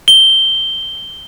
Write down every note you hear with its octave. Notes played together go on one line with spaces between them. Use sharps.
G7